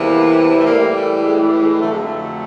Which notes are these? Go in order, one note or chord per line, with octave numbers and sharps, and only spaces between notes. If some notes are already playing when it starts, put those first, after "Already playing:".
Already playing: E2 C3 E3 G3 A#3
A3
A2 E3 G3 A#3
A3
G#3
G3
G#3
F2 D3 F#3 A3
G#3
A3